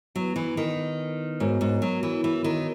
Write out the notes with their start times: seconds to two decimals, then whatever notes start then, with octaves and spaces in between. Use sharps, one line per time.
0.15 F#3 B3 E4 B4
0.36 E3
0.57 D#3
1.40 G#2 B3 F#4 A#4 C#5
1.61 G#2
1.82 F#3
2.03 E3
2.24 E3
2.44 D#3